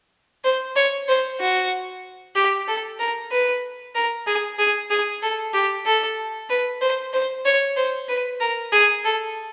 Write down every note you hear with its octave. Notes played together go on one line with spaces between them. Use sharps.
C5
C#5
C5
F#4
G4
A4
A#4
B4
A#4
G#4
G#4
G#4
A4
G4
A4
B4
C5
C5
C#5
C5
B4
A#4
G#4
A4